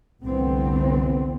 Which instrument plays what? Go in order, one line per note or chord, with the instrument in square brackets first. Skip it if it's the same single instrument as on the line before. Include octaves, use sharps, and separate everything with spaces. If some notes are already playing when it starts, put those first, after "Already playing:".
[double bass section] F1 C2 D3 E3 B3 C4